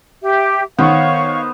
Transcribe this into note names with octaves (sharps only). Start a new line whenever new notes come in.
G4 E5
D#3 B3 C5 C#5 F5 C#6